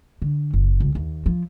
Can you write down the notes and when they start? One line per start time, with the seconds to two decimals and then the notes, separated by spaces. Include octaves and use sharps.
0.22 D3
0.53 F#1
0.80 C#2
0.95 D#2
1.26 F3